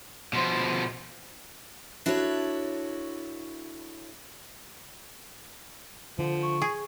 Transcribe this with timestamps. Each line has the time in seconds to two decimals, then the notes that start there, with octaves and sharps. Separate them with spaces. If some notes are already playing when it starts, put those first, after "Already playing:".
0.33 B2 F3
2.06 D4 E4 F#4 A4 B4 C#5
6.19 D3 F3
6.43 C#6
6.62 G#4